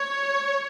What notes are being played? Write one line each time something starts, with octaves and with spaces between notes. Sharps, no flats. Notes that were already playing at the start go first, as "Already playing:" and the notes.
Already playing: C#5